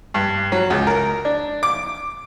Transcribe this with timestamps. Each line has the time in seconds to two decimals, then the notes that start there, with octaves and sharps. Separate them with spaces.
0.14 G2
0.52 F#3
0.70 C#2
0.87 A#4
1.25 D4
1.63 D6